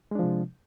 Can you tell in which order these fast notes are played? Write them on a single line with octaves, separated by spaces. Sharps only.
G#3 D4 F3 C3